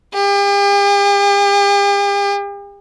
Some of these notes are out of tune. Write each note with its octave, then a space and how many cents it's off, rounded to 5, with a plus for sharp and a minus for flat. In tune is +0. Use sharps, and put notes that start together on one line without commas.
G4 +45